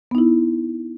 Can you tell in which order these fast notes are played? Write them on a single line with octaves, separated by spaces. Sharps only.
B3 D#4 E4